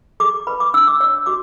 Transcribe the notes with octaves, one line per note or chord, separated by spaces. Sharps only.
G#4 D6
B4 B5
D6
D4 E6
D6
C#5 E6
F#4 D6